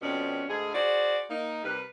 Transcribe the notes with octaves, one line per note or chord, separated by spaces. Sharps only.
F2 B2 C4 C#4 D5
D2 G#2 G#4
F#4 G#4 C5 D5
A#3 D#4
C3 G3 A#4 B4